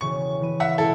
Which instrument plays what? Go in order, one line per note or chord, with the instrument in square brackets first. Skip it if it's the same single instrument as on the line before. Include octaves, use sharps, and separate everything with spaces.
[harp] E1 C#3 D#7 [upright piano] C#6
[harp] E3 B5 D#7
[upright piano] E5 F#5
[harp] B2 G#3 C#4 [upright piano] E4 A4